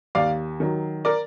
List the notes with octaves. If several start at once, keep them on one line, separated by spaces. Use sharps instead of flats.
D#2 D5 F5
D#3 F#3
A#4 D5